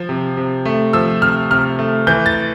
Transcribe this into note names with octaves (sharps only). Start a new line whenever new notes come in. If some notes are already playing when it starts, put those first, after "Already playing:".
Already playing: F3
C3
C3
A3
F3 E6
C3 F6
C3 F6
A3
E3 G6
A6